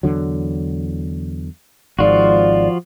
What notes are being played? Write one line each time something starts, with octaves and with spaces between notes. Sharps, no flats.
E2 D3 F#3
G#1 G#2 F3 F4 F#4 D5